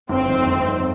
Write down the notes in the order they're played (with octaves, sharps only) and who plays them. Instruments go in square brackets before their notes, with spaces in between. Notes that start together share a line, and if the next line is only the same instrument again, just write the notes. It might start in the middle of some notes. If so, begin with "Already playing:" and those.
[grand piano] G1 [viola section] C4
[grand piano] F2 D#3
G1
F2 D#3